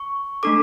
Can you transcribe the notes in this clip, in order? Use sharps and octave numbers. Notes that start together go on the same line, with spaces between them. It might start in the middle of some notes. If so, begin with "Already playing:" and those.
Already playing: C#6
A3 D4 A4 D6